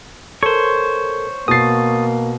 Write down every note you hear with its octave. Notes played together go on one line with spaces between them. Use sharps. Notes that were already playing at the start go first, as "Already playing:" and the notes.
A4 A#4 C5 C#5
B2 A#3 D#6 A6 C7